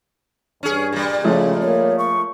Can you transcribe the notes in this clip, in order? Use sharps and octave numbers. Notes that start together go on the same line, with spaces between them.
G2 C#4 G#4
A#2 G3
C#3 F3 G#3 A3
A#3 C#5
C#6